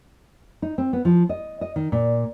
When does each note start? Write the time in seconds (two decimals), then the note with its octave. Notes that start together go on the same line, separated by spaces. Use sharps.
0.62 D#4
0.78 C4
0.93 B3
1.05 F3
1.29 D#5
1.61 D#5
1.76 D#3
1.92 A#2